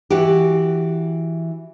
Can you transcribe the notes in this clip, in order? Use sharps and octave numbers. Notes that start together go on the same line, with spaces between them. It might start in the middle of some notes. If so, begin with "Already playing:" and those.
E3 F#4 G4